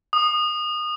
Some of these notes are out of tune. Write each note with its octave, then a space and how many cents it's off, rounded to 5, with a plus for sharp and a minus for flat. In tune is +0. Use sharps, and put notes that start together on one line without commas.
D#6 -25